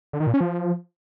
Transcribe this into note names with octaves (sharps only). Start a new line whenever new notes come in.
D3
D#3
A#2
C#4
F3